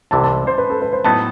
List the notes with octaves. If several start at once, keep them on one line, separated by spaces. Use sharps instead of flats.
C2 C3 E3 A5
A5
C5
B4
A4
B4
C5
A2 F#3 B3 D#4 A5